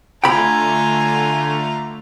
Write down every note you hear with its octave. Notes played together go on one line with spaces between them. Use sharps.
D3 A3 F4 G5 G#5 A#5 B5